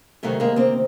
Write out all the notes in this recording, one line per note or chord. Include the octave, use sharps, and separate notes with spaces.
D2 C3 D#3 F#3 A3
G#3 A#3
A#3 C4